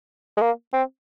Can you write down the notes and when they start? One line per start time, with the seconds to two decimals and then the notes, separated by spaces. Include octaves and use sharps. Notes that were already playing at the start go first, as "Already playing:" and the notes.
0.37 G#3
0.41 A#3
0.73 C4